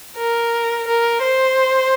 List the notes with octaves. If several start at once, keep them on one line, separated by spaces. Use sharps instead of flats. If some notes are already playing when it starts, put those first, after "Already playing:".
A#4
A#4
C5